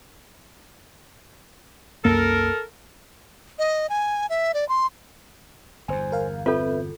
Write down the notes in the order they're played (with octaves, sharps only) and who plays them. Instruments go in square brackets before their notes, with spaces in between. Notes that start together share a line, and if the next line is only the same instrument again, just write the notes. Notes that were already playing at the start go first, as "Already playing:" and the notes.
[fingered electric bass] C2 F#2 A#3 [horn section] A4 A#4
[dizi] D#5
G#5
E5
D5
C6
[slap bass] G1 E2 [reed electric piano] C5 G#5
[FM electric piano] A#4 F5
[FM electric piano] C4 [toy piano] F4 A4 [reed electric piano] B4 E5 G6